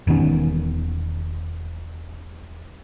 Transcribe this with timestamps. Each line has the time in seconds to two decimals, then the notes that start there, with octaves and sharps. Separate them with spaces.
0.07 E1 D#3 B3 C#4